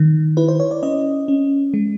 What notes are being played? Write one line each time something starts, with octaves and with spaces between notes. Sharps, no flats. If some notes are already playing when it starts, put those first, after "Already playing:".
Already playing: D#3
E4 B4
C5
C#5
D5
C#4 D#5
C#4
G#3